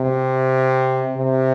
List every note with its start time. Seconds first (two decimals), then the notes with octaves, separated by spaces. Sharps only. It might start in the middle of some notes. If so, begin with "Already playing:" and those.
Already playing: C3
1.17 C3